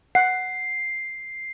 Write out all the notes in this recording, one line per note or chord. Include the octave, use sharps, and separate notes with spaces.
F#5 C7